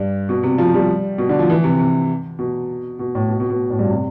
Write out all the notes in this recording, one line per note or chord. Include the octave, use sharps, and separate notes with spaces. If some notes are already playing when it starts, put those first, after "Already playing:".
Already playing: G2
B2
C3
F3
G3
B2
D3
F3
E3
C3
C3
B2
B2
A2
B2
B2
B2
A2
G2
C3